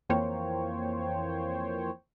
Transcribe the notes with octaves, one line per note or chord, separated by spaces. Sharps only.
F2 E3 A#3 C5 C#5 G5